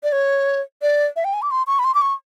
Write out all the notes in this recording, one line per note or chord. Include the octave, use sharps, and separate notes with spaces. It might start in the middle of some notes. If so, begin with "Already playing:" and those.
D5
C#5
D5
E5
G5
G#5
D6
C6
C#6
B5
C6
D6
C#6